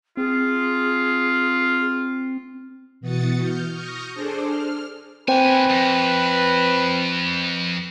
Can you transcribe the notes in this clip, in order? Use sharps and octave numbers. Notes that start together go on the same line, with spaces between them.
C4 F4 G#4
B2 E3 F#4 D#6 A6 C#7
F6 G6
C#6 D#6 F6 G6 A#6
D4 G#4 A4 C5 D5
F6
D#2 C4 B4 C5 G5 G#5
F2